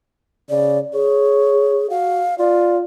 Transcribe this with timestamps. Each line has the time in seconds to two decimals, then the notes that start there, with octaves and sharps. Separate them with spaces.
0.50 C#3 D5
0.94 G#4 C#5
1.90 F#4 F5
2.39 F4 D5